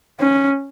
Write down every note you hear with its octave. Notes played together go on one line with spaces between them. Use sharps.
C#4